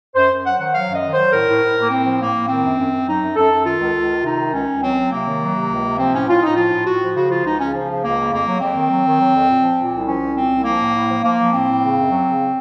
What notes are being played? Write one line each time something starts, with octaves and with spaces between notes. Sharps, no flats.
F#2 C5
F#2
F#3 F#5
D#3 F#5
F#3 F5
F#2
D#5
D#3
F#3 C5
A2 A#4
A2
A2
A2
A#3
A2 C4
F3
A2 A#3
A2
D#3 C4
F#2
F#2
F#2
F#3 D#4
F#2
F#2 A4
F#2
D#3 F4
C#2
C#2
D#3
C3 D#4
D#3
C#2 C#4
C#2
F#3 C4
F#3
C3 A#3
D#3
F#3
C3
C#2
C3
F3 C4
A2 C#4
A2 F4
A2 D#4
F3 F4
A2
A2 F#4
F3
C#3 F#4
F3 F4
C#2 D#4
C#3 C#4
F3
C#3
C#2 A#3
C#3
F2 A#3
F#3
F2 C4
D#3
F#3
D#3
F#3
F2
A#2
F3
A#2
C2
F3 C#4
C2
A#2 C4
C2
F3 A#3
A2
A2
F3
F3 A#3
F3
A2 C4
A2
C#3
F#2
F#3
C#3